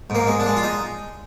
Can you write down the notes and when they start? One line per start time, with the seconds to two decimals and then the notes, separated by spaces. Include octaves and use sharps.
0.10 G#2 A#3
0.27 G#3
0.40 D4
0.46 G#3
0.57 F4
0.63 D#4